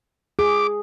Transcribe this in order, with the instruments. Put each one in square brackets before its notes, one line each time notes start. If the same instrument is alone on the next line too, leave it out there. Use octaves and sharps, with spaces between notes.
[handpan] G#4 [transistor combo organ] D6